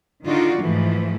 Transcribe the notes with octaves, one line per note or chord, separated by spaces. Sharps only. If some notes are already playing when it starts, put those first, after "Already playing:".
D3 D#3 D#4 F4 F#4 D5
G#2 E3 F3 A3